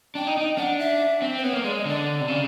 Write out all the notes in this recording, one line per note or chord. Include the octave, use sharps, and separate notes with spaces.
D4 G5
D#4
D#4
D4 F#5
E5
C4
C5
B3 C#5
A#3
G#3 D5
D#5
D3 D5
C3
C#3